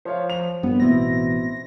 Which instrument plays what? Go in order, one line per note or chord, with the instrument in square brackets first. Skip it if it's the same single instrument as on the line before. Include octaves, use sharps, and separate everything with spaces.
[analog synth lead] F3 [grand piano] C5 C#5 F5
[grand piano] F7
[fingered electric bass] G2 A#2 [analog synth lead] B3
[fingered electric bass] A1 B2 [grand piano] C4 E4 [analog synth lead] A#6